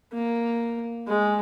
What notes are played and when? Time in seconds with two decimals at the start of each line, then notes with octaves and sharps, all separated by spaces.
0.13 A#3
1.08 G#3